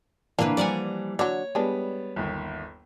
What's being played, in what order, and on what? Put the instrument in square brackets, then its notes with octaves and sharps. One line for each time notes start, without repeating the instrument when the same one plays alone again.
[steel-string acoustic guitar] A#2 D3 F3 [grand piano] E3 [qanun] A#3 B4 [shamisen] D4
[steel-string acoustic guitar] F3 G3 A#5 [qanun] D5 F#5 G#5
[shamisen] D3 F#3 [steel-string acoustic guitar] C#5
[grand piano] G3 B3 [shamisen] G#3 D4
[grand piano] G1 D#2